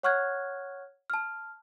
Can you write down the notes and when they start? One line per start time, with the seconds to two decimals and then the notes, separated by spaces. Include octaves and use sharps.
0.03 C#5 F#5 C#6 F6 F#6 G#6
1.10 A5 F6